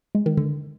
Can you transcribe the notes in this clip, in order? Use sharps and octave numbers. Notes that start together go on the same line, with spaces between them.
G#3
D#3
D3